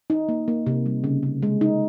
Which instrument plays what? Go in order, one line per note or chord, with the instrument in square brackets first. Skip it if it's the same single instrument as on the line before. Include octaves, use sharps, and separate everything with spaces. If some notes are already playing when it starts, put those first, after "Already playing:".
[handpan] D#4
A#3
A#3
C3
G3
C#3
C#3
G#3
D#4